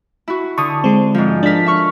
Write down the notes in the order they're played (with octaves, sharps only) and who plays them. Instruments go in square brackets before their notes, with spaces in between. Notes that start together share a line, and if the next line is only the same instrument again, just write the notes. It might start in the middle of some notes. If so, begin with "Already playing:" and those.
[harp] E4 F#4
[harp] D3 [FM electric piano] C#6 D#6
[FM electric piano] G#3 C4
[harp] G#2 F3
[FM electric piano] D4 B6 [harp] A4 A#4
[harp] E5 C#6 F6